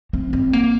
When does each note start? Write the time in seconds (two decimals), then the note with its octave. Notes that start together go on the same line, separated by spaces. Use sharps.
0.13 C4
0.33 C4
0.53 A#3